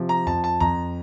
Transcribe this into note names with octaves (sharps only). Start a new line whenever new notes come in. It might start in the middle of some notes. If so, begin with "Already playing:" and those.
Already playing: C3 F3
A#5
F2 A5
A5
F2 A#5